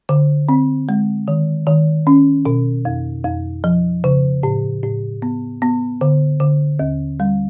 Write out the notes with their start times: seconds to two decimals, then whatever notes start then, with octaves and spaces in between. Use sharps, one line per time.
0.09 D3
0.49 C4
0.89 G#3
1.28 D#3
1.67 D#3
2.07 C#4
2.46 B2
2.85 F2
3.25 F2
3.64 F3
4.04 C#3
4.43 A2
4.83 A2
5.22 B3
5.62 B3
6.01 D3
6.40 D3
6.79 D#2
7.20 G3